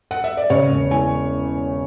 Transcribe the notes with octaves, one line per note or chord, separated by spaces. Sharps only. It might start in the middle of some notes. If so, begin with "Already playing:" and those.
F#5
E5
D5
C#3 C#5
E1
E3 G#5